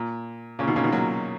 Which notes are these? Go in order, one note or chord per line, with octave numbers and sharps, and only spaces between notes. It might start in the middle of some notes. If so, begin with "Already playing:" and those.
Already playing: A#2
A#2 C#3
B2 D#3
A#2 C#3
B2 D#3
F#3 A#3